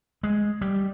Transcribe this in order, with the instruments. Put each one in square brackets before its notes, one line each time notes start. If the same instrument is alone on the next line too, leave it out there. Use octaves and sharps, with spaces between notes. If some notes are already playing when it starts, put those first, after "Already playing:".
[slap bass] G#3
G3